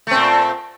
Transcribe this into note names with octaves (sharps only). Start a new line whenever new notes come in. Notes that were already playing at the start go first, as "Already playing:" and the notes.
A#2 A3 C4